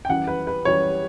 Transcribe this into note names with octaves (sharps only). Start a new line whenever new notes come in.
G5
F#2 E3 G3 F#5
B4
B4
F#2 E3 G3 C#5